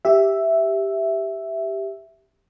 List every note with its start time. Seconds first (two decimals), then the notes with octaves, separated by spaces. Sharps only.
0.05 G4 E5